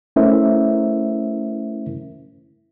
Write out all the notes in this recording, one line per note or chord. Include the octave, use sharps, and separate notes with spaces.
A3 C#4 E4 A#4 C5 E5